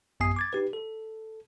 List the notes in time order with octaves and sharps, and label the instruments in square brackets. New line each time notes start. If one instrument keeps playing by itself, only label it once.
[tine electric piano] A1 F#2 B3 G#5 D#6 C7
D6 G#6 A6
D#4 G4 B4
A4